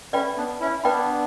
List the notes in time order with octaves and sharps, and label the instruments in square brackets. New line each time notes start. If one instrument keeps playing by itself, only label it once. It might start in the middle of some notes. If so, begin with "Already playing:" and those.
[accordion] A3 C#4 [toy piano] B4 D5 G5 B5
[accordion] B3 D4
C#4 E4
[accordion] B3 D4 [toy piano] B4 D5 G5 B5